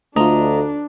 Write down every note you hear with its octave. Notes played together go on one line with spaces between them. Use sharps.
D2 A3 D4 F4 D#5 A#5